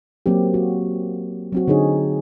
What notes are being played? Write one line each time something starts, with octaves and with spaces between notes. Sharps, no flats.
F#3 A#3 C4 G4
F#4
F#3 C4 F#4
D3 D#4 G#4 C#5